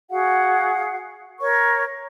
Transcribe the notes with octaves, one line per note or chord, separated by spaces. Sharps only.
F#4 G#4 F5 F#5
A#4 C#5 C#6